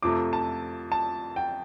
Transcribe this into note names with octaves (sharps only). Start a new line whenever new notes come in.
F2 C3 F3 A3 D6
A5
A5
G5